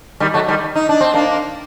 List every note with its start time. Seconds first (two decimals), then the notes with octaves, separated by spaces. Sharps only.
0.20 D#3 G3
0.34 F#3 A3
0.48 D#3 G3
0.75 D#4
0.89 D4
1.01 C4
1.14 A#3 D4